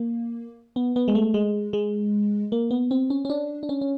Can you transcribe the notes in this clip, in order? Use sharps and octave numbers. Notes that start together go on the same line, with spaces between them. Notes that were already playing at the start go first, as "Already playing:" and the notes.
Already playing: A#3
B3
B3
G#3
A3
G#3
G#3
A#3
B3
C4
C#4
C#4
D4
D4
C#4
C#4